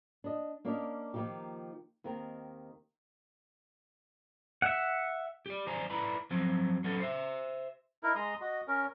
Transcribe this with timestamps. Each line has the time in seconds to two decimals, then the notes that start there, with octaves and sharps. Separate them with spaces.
0.24 D4 D#5
0.65 A#3 C#4 D4 A#4 D5 D#5
1.14 D#3 F3 G#3 A#3 D#4 G4
2.04 D#2 D#3 C4 A#4
4.62 E5 F#5
5.46 G4 D5
5.67 D#3 C5 D5 G#5 A#5
5.90 E4 B4 D5 A#5 B5
6.31 F3 F#3 C4
6.84 F#3 B3 C#4 A4
7.00 C5 E5
8.03 D#4 E4 A#4
8.15 G#3 A#5 C6 D#6
8.41 F#4 D#5
8.68 C#4 A#4